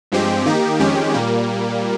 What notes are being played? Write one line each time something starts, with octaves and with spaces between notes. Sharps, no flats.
G2 F3 G#3 C4 G4
D#3 A#3 D#4 G4
F2 D#3 G#3 C#4 G4
A#2 G3 A#3